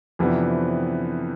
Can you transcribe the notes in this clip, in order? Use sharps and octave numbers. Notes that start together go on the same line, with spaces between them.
F2 C3 E3 B3 D4